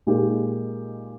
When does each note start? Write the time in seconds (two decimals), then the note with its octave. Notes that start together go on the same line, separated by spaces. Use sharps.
0.07 A#2 G#3 D#4 G4 A#4